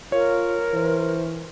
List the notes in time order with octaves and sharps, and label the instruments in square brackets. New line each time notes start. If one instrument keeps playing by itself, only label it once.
[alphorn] F4 [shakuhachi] A#4 [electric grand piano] C#5
[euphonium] E3 [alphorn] C5